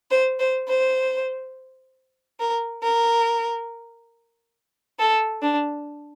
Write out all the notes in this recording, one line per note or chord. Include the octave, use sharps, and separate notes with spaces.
C5
C5
C5
A#4
A#4
A4
D4